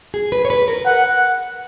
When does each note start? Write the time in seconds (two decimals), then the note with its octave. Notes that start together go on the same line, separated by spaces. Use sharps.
0.14 G#4
0.32 B4
0.45 C#5
0.50 B4
0.68 A#4
0.85 F#5